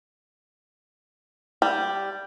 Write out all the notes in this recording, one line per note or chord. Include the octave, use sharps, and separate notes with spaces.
G3